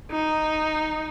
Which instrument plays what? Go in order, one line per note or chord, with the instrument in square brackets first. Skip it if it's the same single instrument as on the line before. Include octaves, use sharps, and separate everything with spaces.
[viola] D#4